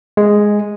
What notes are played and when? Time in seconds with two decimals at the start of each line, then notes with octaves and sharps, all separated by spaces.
0.17 G#3